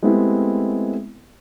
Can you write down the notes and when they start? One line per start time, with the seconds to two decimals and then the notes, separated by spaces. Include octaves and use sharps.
0.03 G#3 A3 B3 C4 E4 G4